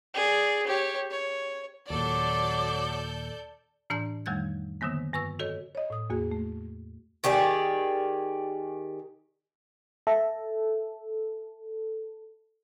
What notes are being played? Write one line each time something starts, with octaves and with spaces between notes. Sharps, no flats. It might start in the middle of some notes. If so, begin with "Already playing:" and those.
G#4 D5
G4 C#5
C#5
D#2 A#2 F#3 A4 D5 D6 G6
A2 E3 D4 D5 A5 G6
F2 D#3 G3 A3 F#6 G#6
D3 D#3 F#3 A#3 B3
G2 B4 C#6 E6
F#4 A4 C#5 D#5
C#5 D#5
A2 D#6
E2 A#3 F#4 G#4
A3
D#3 G4 G#4 D5
A4 E5